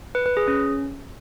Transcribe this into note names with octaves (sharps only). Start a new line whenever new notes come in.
B4
B4
G#4
C#4